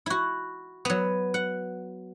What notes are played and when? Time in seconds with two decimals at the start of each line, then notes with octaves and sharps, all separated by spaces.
0.06 E4 F#4
0.85 F#3 B3
1.34 F#5